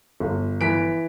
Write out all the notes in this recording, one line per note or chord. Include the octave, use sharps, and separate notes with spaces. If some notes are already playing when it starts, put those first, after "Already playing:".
G1
E3 B6 D7